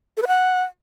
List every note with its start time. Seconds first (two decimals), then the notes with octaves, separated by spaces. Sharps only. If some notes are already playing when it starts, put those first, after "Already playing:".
0.17 A4
0.22 B4
0.27 F#5